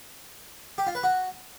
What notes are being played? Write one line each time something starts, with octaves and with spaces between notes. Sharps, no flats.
G4
F4
B4
F#4